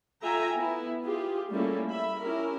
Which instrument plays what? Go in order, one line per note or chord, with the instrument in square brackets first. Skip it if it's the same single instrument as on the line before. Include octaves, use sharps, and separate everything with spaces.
[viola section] F4 A4 E5 G5 G#5 A#5
B3 E4
F4 G4 G#4
G3 A3 A#3 C#4 E4 A4
E5 B5
C#4 E4 G4 A#4